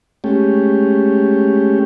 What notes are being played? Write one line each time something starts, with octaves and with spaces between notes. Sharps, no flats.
G#3 A3 C#4 G4